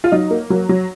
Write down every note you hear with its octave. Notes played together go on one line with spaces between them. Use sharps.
F4
F#3 D#4
A#3
F#3
F#3